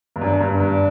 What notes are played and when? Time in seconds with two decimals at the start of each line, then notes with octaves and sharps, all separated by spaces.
0.16 G2
0.21 F#2 D4
0.40 G2
0.50 D4
0.60 G2